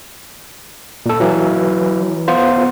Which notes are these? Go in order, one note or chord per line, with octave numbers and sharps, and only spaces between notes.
A#2 A4
E3 F#3
B3 F4 C5